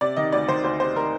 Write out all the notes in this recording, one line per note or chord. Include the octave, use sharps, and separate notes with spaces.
C3 D5
D#3 D#5
D2 D5
D#3 C5
D2 C5
C3 C5
D#3 A#4